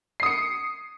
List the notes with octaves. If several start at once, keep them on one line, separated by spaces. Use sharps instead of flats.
D#6 C7 C#7